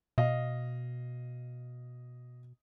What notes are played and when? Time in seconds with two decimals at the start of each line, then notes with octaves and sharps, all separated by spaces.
0.18 B2 D#5 F5